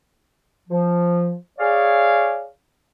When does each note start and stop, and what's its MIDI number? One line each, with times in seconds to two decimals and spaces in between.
0.69 1.34 53
1.59 2.45 68
1.59 2.45 73
1.59 2.45 74
1.59 2.45 77